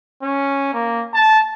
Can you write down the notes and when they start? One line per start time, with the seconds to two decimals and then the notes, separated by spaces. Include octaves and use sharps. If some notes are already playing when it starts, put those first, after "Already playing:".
0.22 C#4
0.73 A#3
1.14 A5